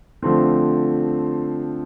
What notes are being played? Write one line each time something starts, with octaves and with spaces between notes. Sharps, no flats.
D3 F3 A3 C4